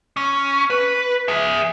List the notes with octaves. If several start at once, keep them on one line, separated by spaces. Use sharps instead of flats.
C#4
B4
G#4 E5